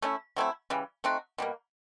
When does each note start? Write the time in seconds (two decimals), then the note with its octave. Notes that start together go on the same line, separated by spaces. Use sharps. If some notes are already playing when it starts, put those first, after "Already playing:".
0.02 A3 C#4 E4
0.36 F#3 A3 C4 E4
0.70 C#3 E3 G3
1.04 A3 C4 D#4 F#4
1.38 B2 G3 A#3